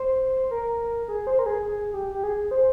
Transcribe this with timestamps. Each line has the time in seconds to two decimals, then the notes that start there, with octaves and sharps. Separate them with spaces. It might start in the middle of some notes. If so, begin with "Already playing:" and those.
Already playing: C5
0.51 A#4
1.08 G#4
1.27 C5
1.39 A#4
1.46 G#4
1.65 G#4
1.94 G4
2.15 G4
2.24 G#4
2.51 C5